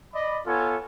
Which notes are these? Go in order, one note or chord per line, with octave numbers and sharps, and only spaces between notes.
D5 D#5 B5
B3 F4 A4 C#5 G#5